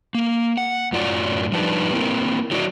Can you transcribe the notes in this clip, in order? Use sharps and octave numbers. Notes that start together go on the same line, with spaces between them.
A#3
F#5
F#2 A2 F#3 F4 D5
F3 G3 D4 D#4 B4 A5
A#3 C4 E4 A#4
F#3 E4 F#4 D5